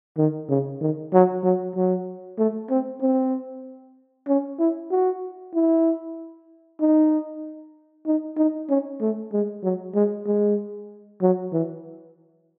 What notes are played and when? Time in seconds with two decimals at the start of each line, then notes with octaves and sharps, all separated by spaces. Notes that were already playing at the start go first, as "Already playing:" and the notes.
0.18 D#3
0.49 C#3
0.81 D#3
1.13 F#3
1.44 F#3
1.76 F#3
2.38 A3
2.70 C4
3.02 C4
4.28 C#4
4.59 E4
4.91 F#4
5.54 E4
6.81 D#4
8.06 D#4
8.37 D#4
8.69 C#4
9.01 A3
9.33 G#3
9.64 F#3
9.95 G#3
10.27 G#3
11.22 F#3
11.53 E3